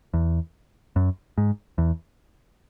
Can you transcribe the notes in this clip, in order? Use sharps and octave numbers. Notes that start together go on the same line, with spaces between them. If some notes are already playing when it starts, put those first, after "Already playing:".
E2
F#2
G#2
E2